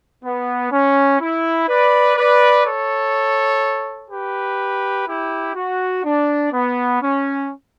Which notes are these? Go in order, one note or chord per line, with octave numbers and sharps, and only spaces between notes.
B3
C#4
E4
B4 D5
B4 D5
A4 C#5
G4 B4
E4 G4
F#4
D4
B3
C#4